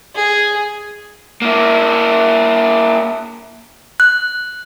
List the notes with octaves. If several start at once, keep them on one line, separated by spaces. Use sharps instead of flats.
G#4
A#3 E4
F#6